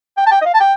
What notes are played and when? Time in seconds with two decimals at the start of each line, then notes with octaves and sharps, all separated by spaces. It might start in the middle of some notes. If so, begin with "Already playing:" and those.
0.17 G5
0.27 A5
0.32 G5
0.41 D#5
0.46 F5
0.54 A5
0.60 G5